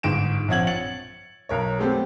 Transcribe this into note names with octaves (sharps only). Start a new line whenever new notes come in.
G1 G#2 D7 E7
A#1 C4 C#5 F#5 G#6 F#7
A6 C#7 F#7
B1 A#4 C#5
G#3 A3 B3 C4 G4 A4